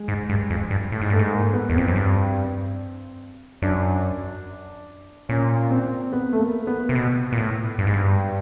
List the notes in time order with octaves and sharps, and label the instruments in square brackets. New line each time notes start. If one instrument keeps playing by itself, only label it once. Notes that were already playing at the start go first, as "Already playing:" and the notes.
Already playing: [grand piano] G#3
[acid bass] G#2
G2
F2
G2
A2
G#2
[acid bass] G2 [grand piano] A3
[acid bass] G#2
[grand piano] A#3
B3
[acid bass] E2
[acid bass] F2 [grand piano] C4
[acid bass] F#2
G2
[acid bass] F#2 [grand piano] D4
[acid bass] A#2 [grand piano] C#4
[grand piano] C4
B3
A3
A#3
B3
[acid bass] C3
B2
A#2
A2
G2
G#2
G2